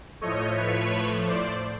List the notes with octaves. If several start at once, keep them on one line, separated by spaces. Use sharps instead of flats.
A2 F3 A3 C#5 D#5
B4 C#5
C5 D5